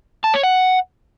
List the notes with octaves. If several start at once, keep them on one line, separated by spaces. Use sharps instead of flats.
A5
C#5
F#5